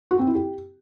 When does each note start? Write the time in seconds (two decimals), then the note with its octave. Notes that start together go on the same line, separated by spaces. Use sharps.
0.11 F#4
0.19 C4
0.27 E4
0.35 G4